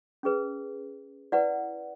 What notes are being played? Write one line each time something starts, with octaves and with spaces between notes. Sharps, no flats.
C#4 G#4 B4
E4 B4 D5 F#5